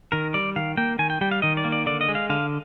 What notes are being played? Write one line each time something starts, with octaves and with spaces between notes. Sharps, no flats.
D#3 A#4
G3 D5
D#3 F5
A#3 G5
D#3 G#5
G5
G3 G5
F5
D#3 D#5
D5
A#3
D5
D3 D5
D#5
G#3
F5
D3 F5